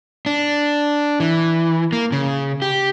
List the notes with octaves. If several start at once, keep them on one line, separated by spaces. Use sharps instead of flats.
D4
E3
A#3
C#3
G4